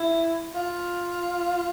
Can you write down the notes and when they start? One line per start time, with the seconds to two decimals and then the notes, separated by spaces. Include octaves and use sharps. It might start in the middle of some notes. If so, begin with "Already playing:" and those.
Already playing: E4
0.54 F4